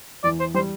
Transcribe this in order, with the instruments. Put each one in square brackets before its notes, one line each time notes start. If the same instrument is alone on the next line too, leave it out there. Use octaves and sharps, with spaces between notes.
[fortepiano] E2 [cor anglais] D5
[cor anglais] C5
[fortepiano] G3 [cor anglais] C5